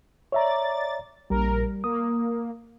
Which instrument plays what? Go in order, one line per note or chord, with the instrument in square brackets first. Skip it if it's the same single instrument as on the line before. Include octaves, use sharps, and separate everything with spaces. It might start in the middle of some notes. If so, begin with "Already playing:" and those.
[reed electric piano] C#5 E5 A#5 [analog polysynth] D5 A6
[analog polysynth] A#1 A#4 [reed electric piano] G3
[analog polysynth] A#3 [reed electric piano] D#6